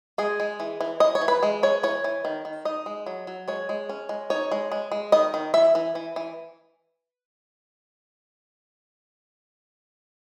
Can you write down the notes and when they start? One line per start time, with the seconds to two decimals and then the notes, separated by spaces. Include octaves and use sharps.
0.18 G#3 G#4
0.40 G#3
0.60 E3
0.81 E3
1.00 E3 D#5
1.15 C#5
1.21 E3
1.28 B4
1.43 G#3
1.63 G#3 C#5
1.83 E3 C#5
2.04 E3
2.25 D#3
2.45 D#3
2.65 D#4 D#5
2.86 G#3
3.06 F#3
3.27 F#3
3.48 G#3 C#5
3.69 G#3
3.89 C#4
4.09 G#3
4.30 D#4 C#5
4.52 G#3
4.72 G#3
4.92 G#3
5.12 D#3 D#5
5.34 D#3
5.54 E3 E5
5.75 E3
5.95 E3
6.16 E3